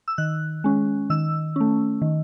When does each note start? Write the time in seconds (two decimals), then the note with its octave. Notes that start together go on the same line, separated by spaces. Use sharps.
0.08 E6
0.18 D#3 F#6
0.64 G#3 C#4
1.10 D#3 E6
1.56 A3 C#4
2.02 D#3